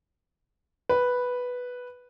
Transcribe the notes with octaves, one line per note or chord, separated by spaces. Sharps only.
B4